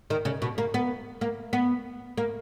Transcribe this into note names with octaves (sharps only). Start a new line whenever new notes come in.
D#3
C#3
B2
A#3
B3
A#3
B3
A#3